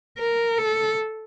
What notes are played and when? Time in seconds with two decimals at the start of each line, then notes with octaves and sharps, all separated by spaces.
0.18 A#4
0.58 A4